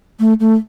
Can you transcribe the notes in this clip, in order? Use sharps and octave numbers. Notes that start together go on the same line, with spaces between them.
A3
A3